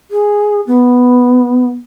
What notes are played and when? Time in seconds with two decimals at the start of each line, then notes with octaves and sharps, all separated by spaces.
0.11 G#4
0.67 B3